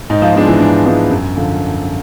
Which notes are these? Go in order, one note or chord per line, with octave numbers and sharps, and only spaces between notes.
G#2 D#4
F3 F4
F3 G#3 B3 D4 F4
E3 E4
G#2 D4
F3 G#3 B3 D4
F#2
D3 F3